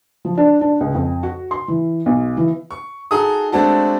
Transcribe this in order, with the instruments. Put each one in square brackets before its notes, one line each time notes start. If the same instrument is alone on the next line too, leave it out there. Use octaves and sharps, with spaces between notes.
[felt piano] F3
D4
D4
C#2
F2
F#4
C6
E3
B1
E3
[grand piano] C#6
D#4 F#4 G#4 A4 A#5 D#6
G#3 A3 C4 D4 F#4 A4